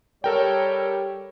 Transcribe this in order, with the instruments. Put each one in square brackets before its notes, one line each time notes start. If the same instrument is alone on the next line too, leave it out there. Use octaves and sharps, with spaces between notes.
[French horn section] G3 C#5 [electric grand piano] A4 A#4 G5